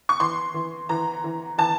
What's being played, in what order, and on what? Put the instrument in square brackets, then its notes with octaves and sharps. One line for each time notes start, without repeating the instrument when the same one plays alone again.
[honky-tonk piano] C#6
E3 C6
E3
E3 A#5
E3
E3 A5